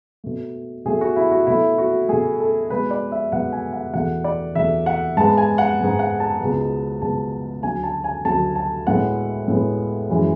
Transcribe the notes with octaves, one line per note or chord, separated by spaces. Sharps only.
B2 A3
B2 A3 G#4
F#4
E4
F#4
B2 A3 E4
F#4
B2 A3 G#4
A4
B2 G#3 B3 B4
D5
E5
B2 G#3 B3 F#5
G#5
F#5
E2 B2 A3 F#5
D5
E2 B2 A3 E5
F#5
G#2 G#3 B3 A5
G#5
F#5
G#2 G#3 B3
F#5
A5
C#2 B2 G#3 B3
C#2 B2 G#3 B3 A5
D2 D3 F#3 G#5
A5
G#5
D2 D3 F#3 A5
A5
A2 G#3 B3 F#5
A2 G#3 B3
F#2 E3 G#3